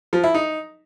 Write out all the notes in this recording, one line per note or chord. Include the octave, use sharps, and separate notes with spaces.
F3
E4
D#4